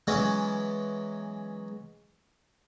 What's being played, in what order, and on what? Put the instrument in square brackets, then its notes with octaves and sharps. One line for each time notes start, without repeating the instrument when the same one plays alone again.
[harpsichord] E3 F#3 G#3 B3 C#4